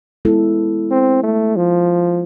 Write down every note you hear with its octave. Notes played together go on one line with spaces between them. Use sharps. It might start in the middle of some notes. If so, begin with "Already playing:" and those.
G#3 B3 E4 A4
C4
A3
F3